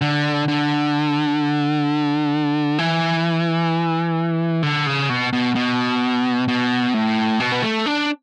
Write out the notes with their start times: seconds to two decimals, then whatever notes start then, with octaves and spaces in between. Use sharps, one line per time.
0.01 D3
0.48 D3
2.79 E3
4.63 D3
4.87 C#3
5.09 B2
5.33 B2
5.55 B2
6.48 B2
6.94 A2
7.40 B2
7.52 B3
7.63 A3
7.86 D4